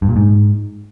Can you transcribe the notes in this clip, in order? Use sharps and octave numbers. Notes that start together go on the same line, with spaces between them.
G2
A#2
G#2